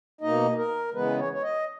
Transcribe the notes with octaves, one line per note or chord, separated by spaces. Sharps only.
B2 A#3 D#4 D#5
A#4
C#3 E3 G#3 B3 B4
C#5
C#5
D#5